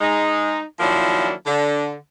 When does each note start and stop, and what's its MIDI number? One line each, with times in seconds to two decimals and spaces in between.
0.01 0.61 56
0.01 0.61 63
0.80 1.32 51
0.80 1.32 53
0.80 1.32 54
0.80 1.32 58
0.80 1.32 62
0.80 1.32 64
1.47 1.93 50